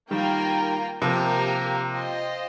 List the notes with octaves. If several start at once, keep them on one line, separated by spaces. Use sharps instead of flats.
D#3 G3 A#3 F4 A#4 G5
C3 F3 A#3 G4 A#4 G5
F4 C5 D#5 G5